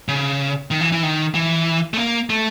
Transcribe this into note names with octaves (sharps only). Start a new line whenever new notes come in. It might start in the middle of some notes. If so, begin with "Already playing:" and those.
C#3
D#3
E3
E3
D#3
E3
A3
A#3
A3